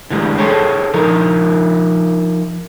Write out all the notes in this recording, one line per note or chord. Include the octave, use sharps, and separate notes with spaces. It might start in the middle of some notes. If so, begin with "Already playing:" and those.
D3 E3 G3 G#3
G#4 A4 C5 C#5 G5 A5
F3 D#4 F4 A#4